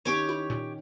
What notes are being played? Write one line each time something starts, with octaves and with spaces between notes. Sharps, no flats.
D#3 C#4 G4 C#5
E4
A#2